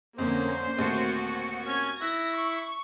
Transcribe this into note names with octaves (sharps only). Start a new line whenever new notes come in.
F2 D3 A#3 C#4 C5
D#2 A#2 A3 C4 F#4 C#7
C#4 G#6
E4 F#6 A#6
C#6